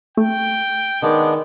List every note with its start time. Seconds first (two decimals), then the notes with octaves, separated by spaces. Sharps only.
0.17 A3 G5
1.02 D#3 G#3 B3 D4